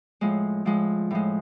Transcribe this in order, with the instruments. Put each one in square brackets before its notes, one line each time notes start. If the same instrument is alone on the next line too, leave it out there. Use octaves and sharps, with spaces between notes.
[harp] A2 F3 G#3
A2 F3 G#3
A2 F3 G#3